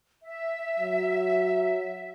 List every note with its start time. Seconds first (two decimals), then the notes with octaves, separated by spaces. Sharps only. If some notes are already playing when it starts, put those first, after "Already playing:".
0.23 E5
0.79 F#3